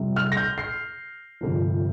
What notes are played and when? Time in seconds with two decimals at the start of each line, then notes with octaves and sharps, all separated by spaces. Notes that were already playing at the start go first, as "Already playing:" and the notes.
Already playing: F2 C3 G3
0.16 F6
0.32 A#6
0.37 G6
0.58 C7
1.41 G1 F2 C3 F3